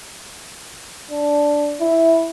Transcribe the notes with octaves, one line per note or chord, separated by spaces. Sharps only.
D4
E4